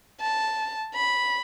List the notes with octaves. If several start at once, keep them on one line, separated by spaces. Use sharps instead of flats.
A5
B5